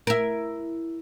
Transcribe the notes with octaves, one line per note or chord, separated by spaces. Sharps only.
E4 A#4